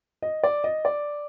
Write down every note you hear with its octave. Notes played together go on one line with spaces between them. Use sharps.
D#5
D5
D#5
D5